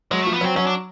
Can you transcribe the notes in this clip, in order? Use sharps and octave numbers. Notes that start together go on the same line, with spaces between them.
F#3 G#3
F3 A3
B3
F#3 C4
F#3 C#4
D4